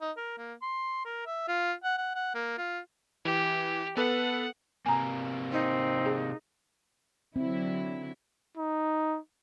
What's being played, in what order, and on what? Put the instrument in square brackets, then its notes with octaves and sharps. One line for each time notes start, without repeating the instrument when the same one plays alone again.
[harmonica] D#4
A#4
A#3
C6
A#4
E5
F4
F#5
F#5
F#5
A#3
F4
[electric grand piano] E3 [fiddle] G4
[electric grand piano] B3 A4 B4 [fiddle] F#5
[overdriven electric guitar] C3 A#3 [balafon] G#5 A#5
[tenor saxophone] C4 [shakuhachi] D#4
[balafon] G#4
[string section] D3 F#3 E4 [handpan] C4
[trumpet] D#4